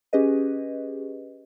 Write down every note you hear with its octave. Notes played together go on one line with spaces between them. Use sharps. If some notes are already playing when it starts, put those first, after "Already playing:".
C#4 G4 G#4 B4 D#5